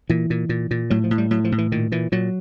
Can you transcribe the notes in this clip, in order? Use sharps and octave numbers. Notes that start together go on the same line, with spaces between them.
A#2 E3
A#2
A#2
A#2
A2 F#3
F3
A2
G3
A2 F#3
F3
A2
E3
A#2 D#3
A#2 E3
A#2 F#3